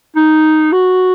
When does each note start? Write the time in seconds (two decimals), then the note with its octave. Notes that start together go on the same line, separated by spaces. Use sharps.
0.16 D#4
0.72 F#4